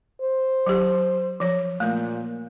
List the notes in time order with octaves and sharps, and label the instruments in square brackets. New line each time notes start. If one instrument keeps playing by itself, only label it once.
[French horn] C5
[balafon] F#3 G4
F3 C#5
[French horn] A#2 [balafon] A3 A#3